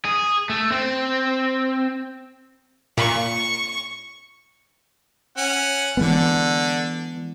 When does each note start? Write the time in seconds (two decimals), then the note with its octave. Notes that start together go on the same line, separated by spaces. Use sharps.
0.05 G#4
0.50 A3
0.72 C4
2.97 A#2 C#6
5.37 C#4 F#5
5.97 D3 E3 G#3 B3